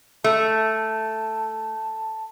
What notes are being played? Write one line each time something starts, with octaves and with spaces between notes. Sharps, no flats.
A3 A5